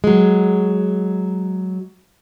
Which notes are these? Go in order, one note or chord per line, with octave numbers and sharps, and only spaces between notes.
F#3 G#3